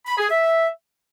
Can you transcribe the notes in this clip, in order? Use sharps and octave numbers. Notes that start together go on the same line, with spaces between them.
B5
G#4
E5